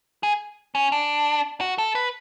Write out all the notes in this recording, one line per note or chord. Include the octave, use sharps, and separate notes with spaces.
G#4
C#4
D4
F#4
A4
B4